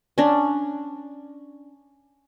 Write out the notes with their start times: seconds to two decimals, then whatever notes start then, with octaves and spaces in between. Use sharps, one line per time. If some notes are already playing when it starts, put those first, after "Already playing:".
0.18 C#4 D4